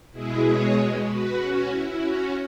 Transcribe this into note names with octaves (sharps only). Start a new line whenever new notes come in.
B2 G#3 E4 G#4
G#4 C#5
F#4 B4
C#4 F#4
E4
C#4 F#4